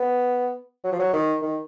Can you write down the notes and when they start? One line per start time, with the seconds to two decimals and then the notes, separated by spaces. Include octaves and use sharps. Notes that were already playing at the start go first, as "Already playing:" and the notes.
Already playing: B3
0.84 F#3
0.92 F3
0.99 F#3
1.13 D#3
1.42 D#3